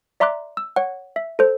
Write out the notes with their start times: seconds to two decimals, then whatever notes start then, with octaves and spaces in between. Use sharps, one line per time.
0.20 D5 E5 A#5 C6 D6 F#6
0.57 E6
0.76 C#5 F#5
1.16 E5
1.39 A4 C5